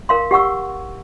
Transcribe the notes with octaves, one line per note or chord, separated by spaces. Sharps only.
A#4 F5 C6
G4 F#5 C#6 E6